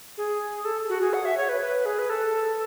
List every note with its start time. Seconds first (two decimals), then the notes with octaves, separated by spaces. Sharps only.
0.18 G#4
0.65 A4
0.89 F#4
1.01 G#4
1.14 F#5
1.25 E5
1.37 C#5
1.49 B4
1.61 B4
1.86 G#4
1.99 B4
2.10 A4